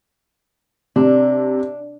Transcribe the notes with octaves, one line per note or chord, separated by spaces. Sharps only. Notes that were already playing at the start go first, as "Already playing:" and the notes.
C3 D4